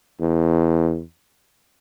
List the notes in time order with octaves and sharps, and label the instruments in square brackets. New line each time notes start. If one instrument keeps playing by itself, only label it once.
[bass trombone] E2